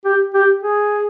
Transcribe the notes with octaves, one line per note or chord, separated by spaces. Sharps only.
G4
G4
G#4